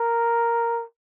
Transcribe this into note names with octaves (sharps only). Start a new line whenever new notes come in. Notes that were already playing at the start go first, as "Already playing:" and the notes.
Already playing: A#4